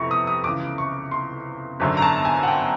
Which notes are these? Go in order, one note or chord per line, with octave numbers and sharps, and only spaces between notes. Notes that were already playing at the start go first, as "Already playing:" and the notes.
Already playing: F1 F2 C3 E3 C#6
D#6
D#6
C#2 C#3 E3 D6
C#6
C6
G#1 F#2 D3
A#5
A5
G#5
F#5
G5